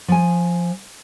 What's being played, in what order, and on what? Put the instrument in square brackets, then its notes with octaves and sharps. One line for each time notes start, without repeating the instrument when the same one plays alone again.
[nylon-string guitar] F3 G#5